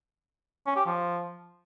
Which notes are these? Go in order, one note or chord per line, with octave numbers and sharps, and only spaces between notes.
C#4
G4
F3